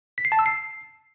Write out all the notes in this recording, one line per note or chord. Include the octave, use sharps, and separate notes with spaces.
B6
C7
A5
E6
C7